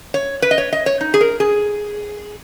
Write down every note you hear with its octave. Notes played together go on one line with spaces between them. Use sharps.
C#5
B4
D#5
C#5
D#5
C#5
D#4
G#4
A#4
G#4